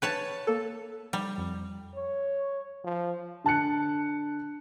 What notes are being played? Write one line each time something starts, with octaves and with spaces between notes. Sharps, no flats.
B4 C#5 G5 A5 A6
A#3 A4
G3
F2
C#5
F3
D3 A5 F#6 C#7